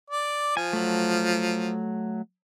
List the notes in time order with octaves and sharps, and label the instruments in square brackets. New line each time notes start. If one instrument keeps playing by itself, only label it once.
[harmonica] D5
[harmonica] F3 [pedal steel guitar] G#5
[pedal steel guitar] F#3 A3